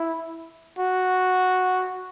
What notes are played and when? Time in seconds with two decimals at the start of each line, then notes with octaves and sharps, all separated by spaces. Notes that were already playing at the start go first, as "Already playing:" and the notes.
Already playing: E4
0.79 F#4